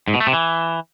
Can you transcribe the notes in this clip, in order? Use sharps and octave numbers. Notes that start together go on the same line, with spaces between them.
G#2
B2
A3
C3
E3